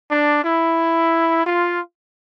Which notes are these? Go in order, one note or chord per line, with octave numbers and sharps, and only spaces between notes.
D4
E4
F4